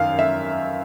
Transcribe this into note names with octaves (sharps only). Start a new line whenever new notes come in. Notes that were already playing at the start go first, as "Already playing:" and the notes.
Already playing: F#2 D#3 F5
E5